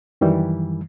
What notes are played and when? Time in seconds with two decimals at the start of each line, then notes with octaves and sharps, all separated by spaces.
0.21 F#2 D#3 E3 G3